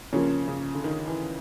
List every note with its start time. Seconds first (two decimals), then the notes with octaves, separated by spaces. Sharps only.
0.13 C#3 F3 A#3 C#4
0.48 C#3
0.75 D3
0.84 D#3
1.08 E3